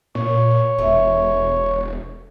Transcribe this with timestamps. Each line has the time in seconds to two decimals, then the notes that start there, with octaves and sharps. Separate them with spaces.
0.15 A#2 C#5
0.78 E1 A3